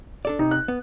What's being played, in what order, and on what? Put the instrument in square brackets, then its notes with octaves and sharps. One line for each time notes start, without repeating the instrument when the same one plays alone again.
[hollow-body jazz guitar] D4 A4 D5
[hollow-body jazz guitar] C3 [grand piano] D#4
[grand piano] F#6
[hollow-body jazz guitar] B3